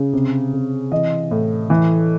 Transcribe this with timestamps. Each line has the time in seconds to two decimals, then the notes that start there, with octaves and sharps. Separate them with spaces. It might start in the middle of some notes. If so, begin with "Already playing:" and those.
Already playing: C#3
0.13 C3
0.53 C3
0.92 E3 D#5
1.31 A2
1.70 E3